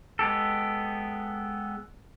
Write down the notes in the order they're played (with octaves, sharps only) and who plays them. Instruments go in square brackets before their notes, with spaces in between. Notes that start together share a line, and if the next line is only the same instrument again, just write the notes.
[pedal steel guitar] G#3 B3 G4 A4